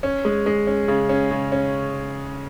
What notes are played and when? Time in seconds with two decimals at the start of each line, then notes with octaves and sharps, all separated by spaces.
0.03 C#4
0.25 G#3
0.46 G#3
0.67 C#4
0.88 C#3
1.09 C#4
1.31 C#3
1.52 C#4